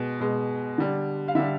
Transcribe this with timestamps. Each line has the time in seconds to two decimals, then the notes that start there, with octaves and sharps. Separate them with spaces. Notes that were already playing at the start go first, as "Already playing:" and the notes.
Already playing: B2 G#3
0.20 B2 G#3
0.78 D3 G3
1.28 F5
1.35 D3 G3 E5